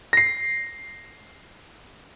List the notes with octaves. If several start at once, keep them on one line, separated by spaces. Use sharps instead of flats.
A#6 C7